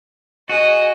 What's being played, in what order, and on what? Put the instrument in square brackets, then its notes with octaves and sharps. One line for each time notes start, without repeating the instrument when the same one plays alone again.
[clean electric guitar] F#4 [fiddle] G#4 D#5